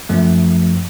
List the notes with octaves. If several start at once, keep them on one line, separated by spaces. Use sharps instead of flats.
F#2 F3 A3